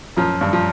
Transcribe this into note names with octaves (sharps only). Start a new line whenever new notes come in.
F#2 F3
G2
F3